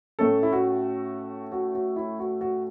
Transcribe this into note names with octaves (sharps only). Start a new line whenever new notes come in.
A2 A3 C#4 A4
E4
F#4
F#4
F#4
E4
F#4
F#4